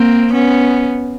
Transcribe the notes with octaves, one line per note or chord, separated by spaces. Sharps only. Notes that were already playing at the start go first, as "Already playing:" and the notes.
Already playing: A#3 C4
B3 C#4